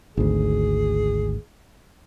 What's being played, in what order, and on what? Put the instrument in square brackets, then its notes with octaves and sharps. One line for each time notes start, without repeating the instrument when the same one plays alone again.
[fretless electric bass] G#1 D2 [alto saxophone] G#4